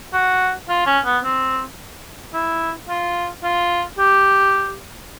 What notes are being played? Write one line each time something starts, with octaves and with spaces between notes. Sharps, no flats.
F#4
F4
C#4
B3
C4
E4
F4
F4
G4